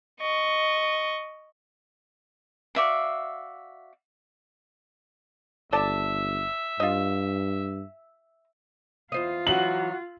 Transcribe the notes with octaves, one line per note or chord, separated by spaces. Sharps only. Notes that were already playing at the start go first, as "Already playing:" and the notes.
D#5 C#6
F#4 D5 E5 F5
G1 A4 D5 E5 A5
G2 F4 D#5
E2 F4 C5 D#5
E3 F#3 D#4 F#4 F#7